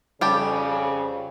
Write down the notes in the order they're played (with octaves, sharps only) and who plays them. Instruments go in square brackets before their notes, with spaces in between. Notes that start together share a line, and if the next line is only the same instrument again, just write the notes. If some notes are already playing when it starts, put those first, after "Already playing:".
[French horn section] F2 C#3 [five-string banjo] G3 G4 A5